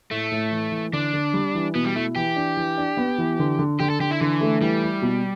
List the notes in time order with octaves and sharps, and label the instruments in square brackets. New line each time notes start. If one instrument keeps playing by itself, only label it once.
[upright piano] A2 [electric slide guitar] A3
[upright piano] A2
E3
E3
[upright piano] D3 [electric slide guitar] D4
[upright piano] D3
G3
E3
[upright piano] B2 [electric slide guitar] B3
[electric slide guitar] G3
[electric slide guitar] A3 [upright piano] E4
[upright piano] E3 [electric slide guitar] G4
[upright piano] D4
E3
D4
B3
E3
D3
D3
[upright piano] D3 [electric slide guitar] G4
[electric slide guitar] A4
[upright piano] D3 [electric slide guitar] G4
[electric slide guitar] E4
[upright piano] D3 [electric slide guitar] E3
[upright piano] A3
[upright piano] E3 [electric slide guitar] G3
[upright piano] E4
B2